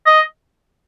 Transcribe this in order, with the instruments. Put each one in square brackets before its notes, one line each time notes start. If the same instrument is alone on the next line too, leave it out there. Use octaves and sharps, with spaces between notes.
[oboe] D#5